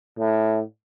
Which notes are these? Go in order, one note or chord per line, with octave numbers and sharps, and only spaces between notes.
A2